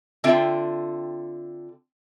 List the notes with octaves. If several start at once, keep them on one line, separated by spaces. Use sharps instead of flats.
D3 C4 F4 E5 G5